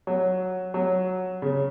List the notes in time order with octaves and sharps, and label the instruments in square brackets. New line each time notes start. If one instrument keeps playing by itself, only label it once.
[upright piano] F#3
F#3
C#3